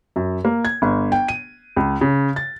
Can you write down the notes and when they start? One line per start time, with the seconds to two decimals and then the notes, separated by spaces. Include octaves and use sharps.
0.16 F#2
0.45 A#3
0.65 G#6
0.82 G1
1.12 G5
1.28 D#7
1.76 C#2
2.01 C#3
2.36 A6